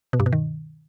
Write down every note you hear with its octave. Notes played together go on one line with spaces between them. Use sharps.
B2
G2
B2
D#3